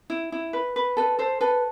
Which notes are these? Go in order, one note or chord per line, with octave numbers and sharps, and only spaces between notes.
E4
E4
B4
B4
A4 B4
A4 C5
A4 B4